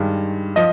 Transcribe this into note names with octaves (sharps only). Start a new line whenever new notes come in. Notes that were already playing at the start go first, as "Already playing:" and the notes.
Already playing: G2 D#3 G#3
F3 D#5